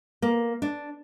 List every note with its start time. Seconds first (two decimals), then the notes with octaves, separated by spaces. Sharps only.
0.22 A#3
0.62 D4